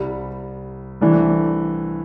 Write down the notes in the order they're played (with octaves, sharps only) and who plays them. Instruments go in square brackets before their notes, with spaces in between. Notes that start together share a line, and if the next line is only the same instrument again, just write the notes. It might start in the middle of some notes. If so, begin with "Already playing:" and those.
Already playing: [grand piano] C2 C3 G3
C2 C3 E3 A3 D4